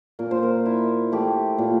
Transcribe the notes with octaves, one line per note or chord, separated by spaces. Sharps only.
A#2 A#4
C5
A#4
E4
A3 G4
A#2